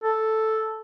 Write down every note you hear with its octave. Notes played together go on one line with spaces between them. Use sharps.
A4